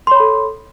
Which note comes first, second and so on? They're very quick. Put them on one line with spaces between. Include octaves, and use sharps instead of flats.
C6 C#5 B5 A4